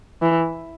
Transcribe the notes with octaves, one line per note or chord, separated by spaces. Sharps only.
E3